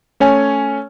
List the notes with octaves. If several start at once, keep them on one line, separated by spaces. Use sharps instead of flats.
A3 C#4 C#5 G#5